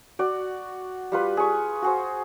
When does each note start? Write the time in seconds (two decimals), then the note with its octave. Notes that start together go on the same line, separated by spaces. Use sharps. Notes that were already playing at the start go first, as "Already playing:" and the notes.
0.19 F#4 D5
1.12 G3 F4 B4
1.37 G#4 C#6
1.82 F#4 G#4 C5